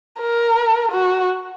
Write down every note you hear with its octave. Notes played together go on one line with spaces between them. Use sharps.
A#4
F#4